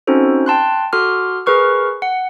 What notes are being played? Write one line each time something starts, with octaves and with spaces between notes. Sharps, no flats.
C4 C#4 D#4 F#4 A4 C5
G5 A5 C6 F#6
F#4 A4 C6 D6 F6
G#4 A#4 B4 C#6 F6
F#5